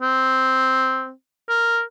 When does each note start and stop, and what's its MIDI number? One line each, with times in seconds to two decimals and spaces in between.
0.03 1.11 60
1.49 1.81 70